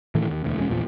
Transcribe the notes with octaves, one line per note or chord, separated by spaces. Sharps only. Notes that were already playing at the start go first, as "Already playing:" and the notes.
A2 D#3 E3 A3
D#2
E1 D2 E3
E1 G#3 C#4
A#1 E2 A#2 F3